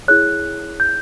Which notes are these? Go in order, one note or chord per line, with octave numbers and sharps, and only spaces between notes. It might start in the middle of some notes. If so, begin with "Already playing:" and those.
E4 G#4 C#5 F#6
G6